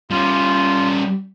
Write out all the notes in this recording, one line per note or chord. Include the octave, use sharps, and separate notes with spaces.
G3 C#4 F4